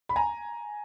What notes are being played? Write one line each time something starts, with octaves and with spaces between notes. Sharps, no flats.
B5
G#5 A#5